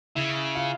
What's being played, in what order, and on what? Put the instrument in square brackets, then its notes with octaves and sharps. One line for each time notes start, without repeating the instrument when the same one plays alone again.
[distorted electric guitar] C#3 [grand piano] E4
[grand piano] F4